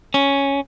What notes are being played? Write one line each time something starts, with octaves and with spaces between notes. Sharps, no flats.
C#4